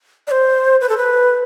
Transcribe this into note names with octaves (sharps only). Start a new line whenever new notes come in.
D5
C5
B4
A4
B4